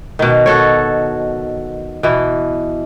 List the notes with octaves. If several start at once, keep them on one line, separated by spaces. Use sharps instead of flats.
B2 D#3
F#4 A4 C#5
B2 E3